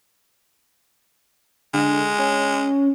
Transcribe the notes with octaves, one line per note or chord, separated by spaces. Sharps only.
D3 G#3
C#4